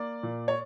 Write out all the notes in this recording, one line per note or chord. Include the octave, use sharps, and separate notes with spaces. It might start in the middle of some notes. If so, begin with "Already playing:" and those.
Already playing: A#3 D5
A#2
C#5